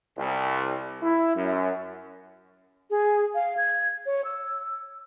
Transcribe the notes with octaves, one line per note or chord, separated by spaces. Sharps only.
C2
E4
F#2
G#4
F5
G#6
C#5
E6